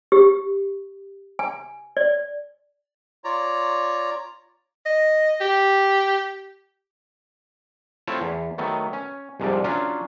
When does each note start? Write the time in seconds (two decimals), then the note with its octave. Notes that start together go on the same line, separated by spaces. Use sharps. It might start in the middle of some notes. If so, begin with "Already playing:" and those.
0.12 G4
1.39 G#5
1.97 D5
3.24 F4 C#5 D5 A#5
4.86 D#5
5.41 G4
8.07 A3 C4 E4 F4 C#5 A5
8.21 E2
8.58 D#3 F#3 A3 B3
8.93 C#4
9.40 C2 G#2 C3 F3 D5
9.64 F#3 C#4 D4 F4